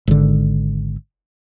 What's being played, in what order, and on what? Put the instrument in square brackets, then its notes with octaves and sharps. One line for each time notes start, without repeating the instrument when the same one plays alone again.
[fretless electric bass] G#1 D3